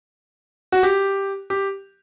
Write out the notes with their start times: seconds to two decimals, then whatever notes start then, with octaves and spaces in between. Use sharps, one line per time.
0.72 F#4
0.83 G4
1.50 G4